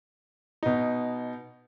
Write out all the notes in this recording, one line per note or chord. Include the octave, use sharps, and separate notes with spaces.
B2 D#4